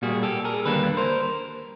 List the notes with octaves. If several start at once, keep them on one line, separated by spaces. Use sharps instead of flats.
A#2 G3 A#3 F#4 G#4
G4 A4
G#4 A#4
D#2 D3 G3 A#3 A4 B4
A#4 C5